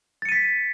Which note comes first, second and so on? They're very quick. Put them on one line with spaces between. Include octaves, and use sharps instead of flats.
A6 C#7 D#7 B6